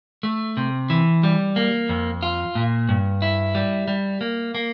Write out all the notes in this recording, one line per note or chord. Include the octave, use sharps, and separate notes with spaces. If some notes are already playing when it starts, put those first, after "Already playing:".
A3
C3
E3
G3
A#3
F2
F4
A#2
G2
E4
G3
G3
A#3
A#3